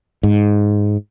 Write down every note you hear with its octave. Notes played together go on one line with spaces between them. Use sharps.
G#2